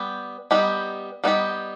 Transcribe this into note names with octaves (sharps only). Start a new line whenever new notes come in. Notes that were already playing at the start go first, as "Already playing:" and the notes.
Already playing: G3 B3 G4
G3 B3 D#4 G4
G3 B3 D#4 G4